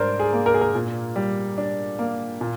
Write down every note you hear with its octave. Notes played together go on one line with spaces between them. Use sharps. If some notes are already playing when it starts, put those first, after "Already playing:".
Already playing: G#2 G3 D4 A#4 C5 D5
G#4
A#3
A#4
G#4
A#4
A#2
G3
D4
A#3
A#2